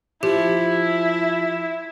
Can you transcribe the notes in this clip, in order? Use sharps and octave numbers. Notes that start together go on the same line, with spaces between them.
F3 E4 G4